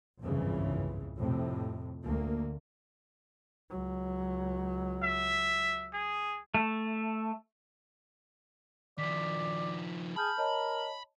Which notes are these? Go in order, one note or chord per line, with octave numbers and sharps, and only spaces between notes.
G1 C2 F2 G#2 C#3 E3
F2 A2 C3
D2 A#3
C#2 F#3
E5
G#4
A3
D#3 F3 D5 B6
G#4 A5 B5 F6 G6
A#4 C#5 D#5 A5